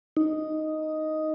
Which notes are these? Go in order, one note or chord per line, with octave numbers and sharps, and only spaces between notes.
D#4